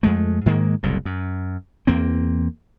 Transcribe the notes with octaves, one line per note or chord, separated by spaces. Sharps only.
F2 G#3 A3
G#2 D#3 G#3 A#3
F#1 C2 A2
F#2
E2 A#3 C4